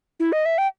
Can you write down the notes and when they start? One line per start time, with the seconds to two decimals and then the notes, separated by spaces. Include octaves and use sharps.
0.20 E4
0.32 D#5
0.45 E5
0.58 G5